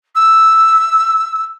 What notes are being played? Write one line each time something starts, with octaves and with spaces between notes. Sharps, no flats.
E6